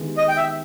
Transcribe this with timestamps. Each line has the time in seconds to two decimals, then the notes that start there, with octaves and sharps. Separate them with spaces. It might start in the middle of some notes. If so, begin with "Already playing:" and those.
Already playing: D#3 G#3 B3 E4 G4
0.17 D#5
0.28 G5
0.37 E5